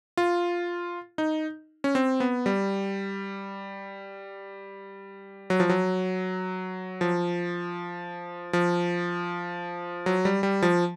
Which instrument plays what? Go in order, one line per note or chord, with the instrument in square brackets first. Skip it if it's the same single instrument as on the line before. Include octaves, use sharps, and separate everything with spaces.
[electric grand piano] F4
D#4
C#4
C4
B3
G3
F#3
F3
F#3
F3
F3
F#3
G3
G3
F3